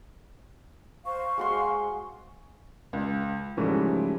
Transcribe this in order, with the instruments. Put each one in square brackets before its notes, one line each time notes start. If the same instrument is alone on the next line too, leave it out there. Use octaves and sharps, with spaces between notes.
[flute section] C5 F5 C#6
[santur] G#3 F#4 C6
[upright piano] C#2
G#2 C#3 E3 F3 G3 A3